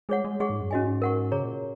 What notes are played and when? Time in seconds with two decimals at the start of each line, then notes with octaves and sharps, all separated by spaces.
0.09 G#3 G#4 C#5 F#5
0.25 G#3
0.40 G#3 G#4 F#5 C#6
0.50 G#2
0.60 F#2
0.71 G#2 C#4 F#4 D#5 G#5
1.02 A#4 F#5 C#6
1.32 C#3 G#4 C#5 A#5
1.43 A#2